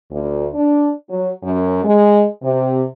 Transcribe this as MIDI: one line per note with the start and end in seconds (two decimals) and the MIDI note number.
0.11 0.48 38
0.55 0.90 62
1.10 1.30 54
1.43 1.84 42
1.84 2.26 56
2.43 2.83 48